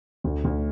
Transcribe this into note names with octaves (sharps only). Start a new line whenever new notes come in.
D2
D2